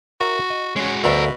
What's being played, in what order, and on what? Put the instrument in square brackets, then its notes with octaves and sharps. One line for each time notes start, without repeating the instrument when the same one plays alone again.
[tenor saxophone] F#4 [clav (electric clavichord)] A#4 C#5 E5
[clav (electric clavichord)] D#5
[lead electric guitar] G#3 F#4 [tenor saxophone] C#4
[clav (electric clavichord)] D2 F5 [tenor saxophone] B2 [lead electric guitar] A#4 E5